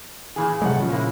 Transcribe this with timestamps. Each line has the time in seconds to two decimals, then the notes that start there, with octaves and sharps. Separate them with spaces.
0.36 A#2 E3 G#4
0.62 C3 F#3 G#3 A3 F#5
0.78 A#2 C#3 F3
0.90 G#3 A#3 E4